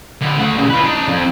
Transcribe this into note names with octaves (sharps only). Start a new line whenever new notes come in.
D3 B3
A3 F#5
A#2 C#3
F4 B4
D4 D#4
F2